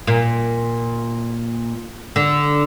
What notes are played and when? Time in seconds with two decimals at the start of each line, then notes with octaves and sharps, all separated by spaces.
0.07 A#2
2.16 D3